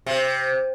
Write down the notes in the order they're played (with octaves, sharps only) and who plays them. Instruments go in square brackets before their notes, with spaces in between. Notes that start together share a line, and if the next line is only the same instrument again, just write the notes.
[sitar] C3